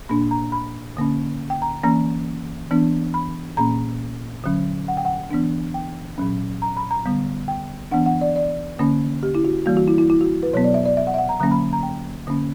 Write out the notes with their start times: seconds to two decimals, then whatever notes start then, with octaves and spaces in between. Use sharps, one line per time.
0.09 A#2 A#3 D4 B5
0.31 A#5
0.52 B5
0.97 D3 A#3 C#4
1.50 G5
1.62 A#5
1.84 E3 A#3 C#4 A#5
2.71 E3 B3 D4
3.14 B5
3.57 A#2 A#3 C#4 A#5
4.44 D3 F#3 C#4
4.88 F#5
4.97 G5
5.05 F#5
5.31 E3 B3 D4
5.74 G5
6.18 A#2 F#3 C#4
6.62 A#5
6.77 B5
6.91 A#5
7.06 D3 G3 B3
7.48 G5
7.92 E3 B3 D4 F#5
8.06 F#5
8.21 D5
8.36 D5
8.79 D3 A#3 C#4
9.23 G4
9.35 E4
9.45 F#4
9.66 E3 G3 A#3 F#4
9.77 F#4
9.87 E4
9.98 E4
10.10 E4
10.21 F#4
10.43 B4
10.53 B2 F#3 B3 C#5
10.64 D5
10.74 E5
10.86 D5
10.97 E5
11.07 F#5
11.14 E5
11.18 F#5
11.29 A#5
11.40 D3 F#3 A#3 C#4 A#5
11.51 B5
11.73 A#5
11.83 G5
12.27 D3 A#3 C#4